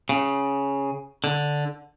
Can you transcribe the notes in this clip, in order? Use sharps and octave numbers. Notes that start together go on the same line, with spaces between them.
C#3
D3